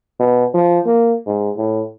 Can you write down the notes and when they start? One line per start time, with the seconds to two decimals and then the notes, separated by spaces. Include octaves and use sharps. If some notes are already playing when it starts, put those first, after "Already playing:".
0.20 B2
0.54 F3
0.86 A#3
1.26 G#2
1.57 A2